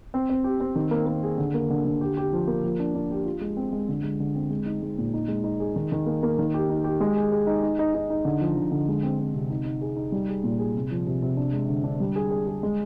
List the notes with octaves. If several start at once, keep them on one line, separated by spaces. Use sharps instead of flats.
C4
C4
G4
C4
D#3
A#3
A#3
G#4
D3
A#3
D3
D3
G4
G4
F3
A#3
F3
D4
D4
G4
F4
G#3
C4
G#3
D3
G#3
D3
C4
G#3
D#4
G#3
A#2
D#4
G#3
D#4
G#4
D#3
D#3
A#3
A#3
D#3
G4
D#4
G4
G#3
G#4
G#4
D#4
D#4
D#4
D#4
D#4
D3
F3
D3
D3
G#3
C4
C4
C3
D#4
D#4
G#4
D#4
G3
G#4
A#2
G#4
C3
F3
C3
C3
D4
G#3
D3
D4
G3
G#4
G#4
G#4
G#3